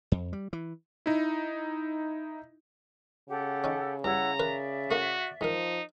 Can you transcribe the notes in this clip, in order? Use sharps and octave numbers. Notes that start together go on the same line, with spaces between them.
F2
G3
E3
D#4 E4
C#3 G4 A4 F#5
C#4 D#4
G2 E4 C#5 F#5 A#5
A#4 B4 D5 E5
A3 A#3 F#4
G#2 F3 D#4 A#4